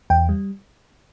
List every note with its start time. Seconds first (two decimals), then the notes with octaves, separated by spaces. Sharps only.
0.10 E2 G5
0.29 G3